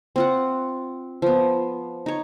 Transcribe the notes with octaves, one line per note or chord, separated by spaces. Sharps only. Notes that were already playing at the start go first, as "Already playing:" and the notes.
C4 F4 F#5
F3 B3
D#4 C#5